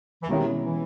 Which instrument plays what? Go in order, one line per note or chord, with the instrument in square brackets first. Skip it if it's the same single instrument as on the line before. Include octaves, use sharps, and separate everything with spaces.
[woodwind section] E3
[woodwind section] D#2 D#3 [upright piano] B2 G#3 C#4 E4
[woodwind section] E3